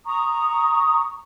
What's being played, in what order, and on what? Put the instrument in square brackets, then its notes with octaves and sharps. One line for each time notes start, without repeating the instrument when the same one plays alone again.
[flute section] A#5 C#6 D#6